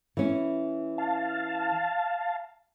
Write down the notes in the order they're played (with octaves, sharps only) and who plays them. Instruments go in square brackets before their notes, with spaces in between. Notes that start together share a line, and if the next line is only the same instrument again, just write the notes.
[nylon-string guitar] E3 C#4
[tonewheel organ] F5 A5